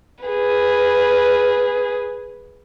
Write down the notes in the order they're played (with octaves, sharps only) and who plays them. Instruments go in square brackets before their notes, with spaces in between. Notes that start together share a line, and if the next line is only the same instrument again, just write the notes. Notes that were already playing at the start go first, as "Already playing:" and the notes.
[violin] G#4 B4